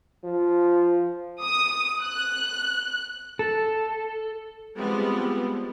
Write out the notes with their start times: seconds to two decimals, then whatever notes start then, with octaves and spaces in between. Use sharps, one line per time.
0.24 F3
1.43 D#6
2.02 F#6
3.39 A4
4.77 F3 G3 G#3 B3 C4